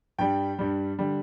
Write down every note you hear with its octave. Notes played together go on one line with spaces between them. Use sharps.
G2 G3 G5
G2 G3
D3 G3